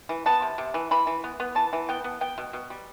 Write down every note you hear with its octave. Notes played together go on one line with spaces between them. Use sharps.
E3
B3 A5
C3
C3
E3
E3 B5
E3
B3
B3
E3 A5
E3
B3 G5
B3
B3 G5
B2
B2
G3